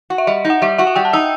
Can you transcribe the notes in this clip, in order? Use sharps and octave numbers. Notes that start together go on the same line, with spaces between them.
F#4
E5
G3 D#5
D#4
F#5
G3 E5
F#4 E5
F#5
G3 G5
A5
D#4 E6